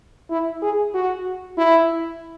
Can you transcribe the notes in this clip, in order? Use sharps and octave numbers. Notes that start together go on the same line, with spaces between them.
E4
G#4
F#4
E4